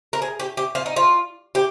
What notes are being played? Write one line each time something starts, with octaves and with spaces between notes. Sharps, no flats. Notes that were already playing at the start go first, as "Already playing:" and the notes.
A#4
G#4
G4
G4
F4
D#4
F4
G4